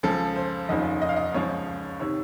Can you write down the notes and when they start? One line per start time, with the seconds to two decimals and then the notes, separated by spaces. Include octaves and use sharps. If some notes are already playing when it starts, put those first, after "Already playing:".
0.03 C#2 C#3 F3 A4
0.36 C5
0.69 F1 D#2 C#3 F3 D#5
1.02 D#5
1.09 F5
1.16 D#5
1.34 C#2 C#3 F3 C#5
2.00 C3 D#3 C#5